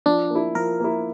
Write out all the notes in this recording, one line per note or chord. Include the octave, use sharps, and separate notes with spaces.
F3 D4
A#3
E4
F3 A#4
A#3 E4